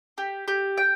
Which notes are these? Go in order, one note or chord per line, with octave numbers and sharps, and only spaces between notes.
G4
G4
G5